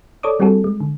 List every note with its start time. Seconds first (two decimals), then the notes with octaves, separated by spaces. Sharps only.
0.23 A4 C#5 D5 D6 D#6
0.40 G3 C4 D4 F#4 G#4 A4
0.64 G#3
0.80 D3